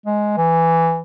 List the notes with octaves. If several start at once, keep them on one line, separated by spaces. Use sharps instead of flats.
G#3
E3